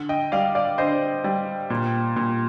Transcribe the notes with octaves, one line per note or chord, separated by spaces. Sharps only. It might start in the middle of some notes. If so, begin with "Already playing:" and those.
Already playing: D3
D#5 G5
G3 D5 F5
D5 F5
D3 C5 D#5
G3
A#2
A#2